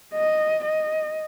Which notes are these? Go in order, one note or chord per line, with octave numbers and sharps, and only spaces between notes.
D#5
D#5